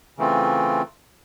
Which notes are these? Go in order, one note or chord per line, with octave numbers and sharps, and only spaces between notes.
C#3 E3 A3 C4 F4